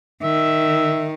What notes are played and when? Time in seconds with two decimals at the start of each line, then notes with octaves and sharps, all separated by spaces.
0.23 D#3 E5